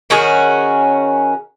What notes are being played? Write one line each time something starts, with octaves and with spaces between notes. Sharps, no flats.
D#3 C#4 F#4 G#4